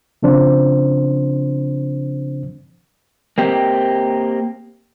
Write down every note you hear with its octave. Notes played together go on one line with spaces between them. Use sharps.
C#3 F3 C4 D4 C5
A#3 C4 G4